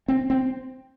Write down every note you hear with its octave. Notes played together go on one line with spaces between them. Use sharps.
C4
C4